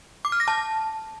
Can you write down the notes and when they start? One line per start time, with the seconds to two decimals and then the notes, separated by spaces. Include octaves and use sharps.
0.25 D6
0.32 F6
0.40 A#6
0.48 A5